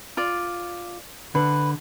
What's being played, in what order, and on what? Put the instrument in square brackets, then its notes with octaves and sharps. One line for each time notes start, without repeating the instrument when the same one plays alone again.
[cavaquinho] F4 D5
[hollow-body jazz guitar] D3 [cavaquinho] B4